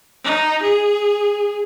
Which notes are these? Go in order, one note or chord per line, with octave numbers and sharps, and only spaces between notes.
D#4
G#4